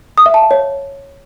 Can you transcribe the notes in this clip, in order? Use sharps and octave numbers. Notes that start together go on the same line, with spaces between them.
D#6
E5
A5
F5
C#5